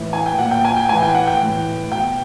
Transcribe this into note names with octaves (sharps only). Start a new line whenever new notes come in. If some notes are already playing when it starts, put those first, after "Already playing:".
Already playing: A2 E3
G#5
G5
A#2 F#5
G5
G#5
G5
A2 E3 G#5
G5
F#5
G5
A2 E3
B2 G5